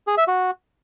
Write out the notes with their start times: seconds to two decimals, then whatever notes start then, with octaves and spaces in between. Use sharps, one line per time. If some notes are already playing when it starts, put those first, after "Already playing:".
0.07 G#4
0.17 E5
0.28 F#4